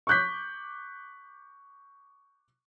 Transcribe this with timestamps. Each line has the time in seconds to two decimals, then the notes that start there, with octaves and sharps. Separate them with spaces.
0.07 C#6 D6 F#6 G6 B6